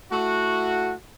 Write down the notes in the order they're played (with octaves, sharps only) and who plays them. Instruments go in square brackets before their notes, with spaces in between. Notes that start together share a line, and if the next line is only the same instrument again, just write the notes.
[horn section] A3 E4 F#4